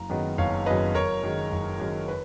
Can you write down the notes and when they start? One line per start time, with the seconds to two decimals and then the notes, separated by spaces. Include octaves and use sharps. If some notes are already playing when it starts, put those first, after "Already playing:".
Already playing: F#1 A#5
0.10 F#2 D#3 G#3 B3
0.38 F#1 C#5 F5
0.66 F#2 D#3 G#3 B3 B4 D#5
0.95 F#1 A#4 C#5
1.23 F#2 D#3 G#3
1.52 F#1
1.80 F#2 D#3 G#3
2.08 B4